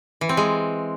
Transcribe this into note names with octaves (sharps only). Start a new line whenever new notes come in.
E3
C4
G#3